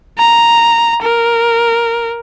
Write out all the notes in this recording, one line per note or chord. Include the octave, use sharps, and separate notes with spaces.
A#5
A#4